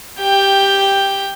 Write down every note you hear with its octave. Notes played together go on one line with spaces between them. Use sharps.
G4 G5